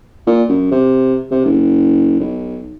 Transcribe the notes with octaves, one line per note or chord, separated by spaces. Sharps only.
A#2
F#2
C3
C3
F#1
B1